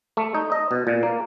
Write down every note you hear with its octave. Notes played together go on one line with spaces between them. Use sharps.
A3
D#4
D#5
B2
A#2
A#3